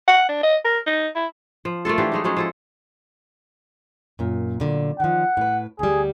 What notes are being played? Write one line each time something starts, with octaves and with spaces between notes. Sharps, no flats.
F#5
D4
D#5
A#4
D#4
E4
F3
A3 A#3 F4 A4
E3 D4 G4 C5
G#3 A3 D#4
F3 F#3 G#3 C#4
F3 E4 A4
F#2 A#2
A#2 D3 F#3
D#3 F3 F#5
A2 B4
D2 G3 G#4